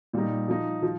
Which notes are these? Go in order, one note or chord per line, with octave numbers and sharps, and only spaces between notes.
A#2 G3 D#4
F3 D#4
F3